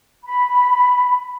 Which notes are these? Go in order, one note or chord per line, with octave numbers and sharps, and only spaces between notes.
B5